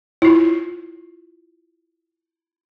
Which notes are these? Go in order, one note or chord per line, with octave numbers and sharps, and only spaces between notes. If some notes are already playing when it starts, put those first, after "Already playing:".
E4 F4